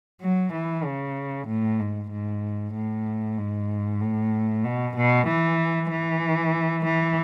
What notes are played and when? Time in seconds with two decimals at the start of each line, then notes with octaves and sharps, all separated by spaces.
0.21 F#3
0.53 E3
0.84 C#3
1.47 A2
1.80 G#2
2.11 G#2
2.74 A2
3.38 G#2
4.01 A2
4.64 B2
4.96 B2
5.28 E3
5.91 E3
6.85 E3